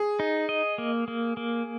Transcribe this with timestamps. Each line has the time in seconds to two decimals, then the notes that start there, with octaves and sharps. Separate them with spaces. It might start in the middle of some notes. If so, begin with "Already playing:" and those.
Already playing: G#4
0.20 D#4
0.49 D#5
0.78 A#3
1.08 A#3
1.37 A#3